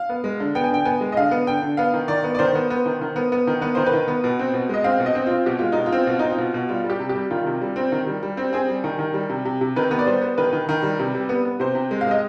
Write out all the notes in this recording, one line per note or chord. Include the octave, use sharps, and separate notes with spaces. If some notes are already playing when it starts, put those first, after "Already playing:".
Already playing: F5
B3
G#3
D3
B3 G5
G#5
D3 G5
B3 G#5
G#3
D#5
D3 F5
B3
D3 G5
D3
B3 F5
D#3
D#3 D5
B3
D5
D#3 C5
B3
B3
D#3
D#3
B3
B3
D#3
B3 B4
D#3 C5
B4
D#3
B3
B2
C4
B2
G#3 D#5
C4 F5
B2
D#5
C4
C4 F4
B2 G4
G#3 F4
D#4
B2
F4
C4
B2 F4
C4 D#4
F4
B2
B2
G3 F4
G3
G4
C3
G4
G3
D#3 F4
C3
G3
C4
D#3
G3
G3
C4
C4 G#4
G3
D#3
D#3
G3
C3
C3
C3
D#3 B4
B3
D5
G3 C5
B3
D#3 B4
D#3
D#3
G3
C3
G3
B3
B3
C3 C5
C3
G#3
F5
G#3 D#5